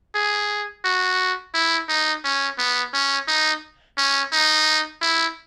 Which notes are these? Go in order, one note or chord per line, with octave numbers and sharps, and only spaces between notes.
G#4
F#4
E4
D#4
C#4
B3
C#4
D#4
C#4
D#4
E4